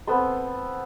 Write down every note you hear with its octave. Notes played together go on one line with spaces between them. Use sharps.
B3 C4 A4 C6